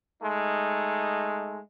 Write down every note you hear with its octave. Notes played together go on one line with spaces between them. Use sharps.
G#3 A3 D#4